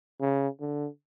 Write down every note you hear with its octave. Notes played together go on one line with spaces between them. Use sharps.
C#3
D3